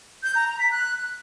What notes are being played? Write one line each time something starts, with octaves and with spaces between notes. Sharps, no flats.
G6
A#5
A#5
B6
F#6